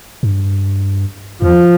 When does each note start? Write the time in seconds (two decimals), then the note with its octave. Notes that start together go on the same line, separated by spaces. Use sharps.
0.23 G2
1.42 E2 F3